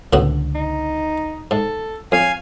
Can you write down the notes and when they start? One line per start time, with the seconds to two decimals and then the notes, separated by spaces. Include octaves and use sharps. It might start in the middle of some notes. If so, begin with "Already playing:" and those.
0.13 C#2 A2 D3 B3 F#4
0.55 D#4
1.51 G#2 A4
2.12 F2 C#5 F5 G#5